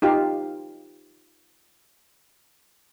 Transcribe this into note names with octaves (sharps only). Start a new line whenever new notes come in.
D#4 F4 G4 F5